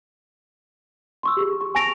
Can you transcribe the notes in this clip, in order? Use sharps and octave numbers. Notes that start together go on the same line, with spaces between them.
C6 C#6 E6
G4 G#4
C#6
G#5 A5 C#6 A#6 D7 F7